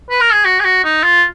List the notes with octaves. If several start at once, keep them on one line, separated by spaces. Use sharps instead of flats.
B4
A#4
G#4
F#4
G#4
F#4
D#4
F4